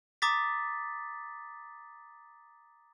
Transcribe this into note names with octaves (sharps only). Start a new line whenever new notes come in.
A#5 D6 D#6 A6 B6